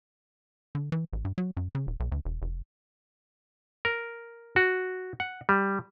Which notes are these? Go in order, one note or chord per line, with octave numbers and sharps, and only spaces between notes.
D3
E3
A1
G2
F#3
F#2
C#3
D#1
B1
D2
E1
F1
A#4
F#4
F#5
G3